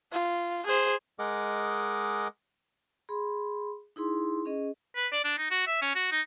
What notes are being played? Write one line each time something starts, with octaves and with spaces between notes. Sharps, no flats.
F4
G#4 C5
G#3 G#4 A#4 D#5 F#5 D6
G#4 B5 C6
D#4 E4 G#4 C6
C#4 G#4 D#5
B4
D5
D4
D#4
F#4
E5
C#4
F#4
D#4